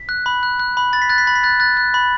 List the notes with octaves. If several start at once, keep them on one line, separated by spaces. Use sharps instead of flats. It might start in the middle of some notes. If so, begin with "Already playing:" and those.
Already playing: B6
F#6
B5
F#6
F#6
B5
B5 A6
B6
F#6 A6
B6
B5 A6
B6
F#6 A6
F#6 A6
F#6
B5